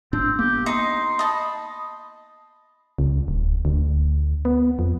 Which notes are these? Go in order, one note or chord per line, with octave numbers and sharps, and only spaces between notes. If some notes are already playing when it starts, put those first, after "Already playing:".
G#1 A2 C4 D4
A#3 B3 G4
D#4 C6
D#5 A5 B5
C#2
D1
D2
B3
F2